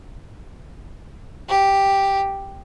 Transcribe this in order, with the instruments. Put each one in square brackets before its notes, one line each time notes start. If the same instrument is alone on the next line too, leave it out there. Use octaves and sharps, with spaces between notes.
[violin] G4